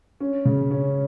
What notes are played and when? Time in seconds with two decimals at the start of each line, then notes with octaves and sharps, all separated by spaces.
0.20 C#4
0.45 C#3
0.71 C#4